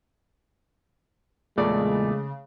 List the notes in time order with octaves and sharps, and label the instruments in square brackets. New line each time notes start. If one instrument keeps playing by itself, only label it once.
[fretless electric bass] E2 A#2 [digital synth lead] C#3 [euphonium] G#3 [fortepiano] A3 D5